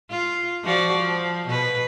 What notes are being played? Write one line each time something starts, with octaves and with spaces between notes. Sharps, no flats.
F4
F3 F#4 D5
F3
B2 B4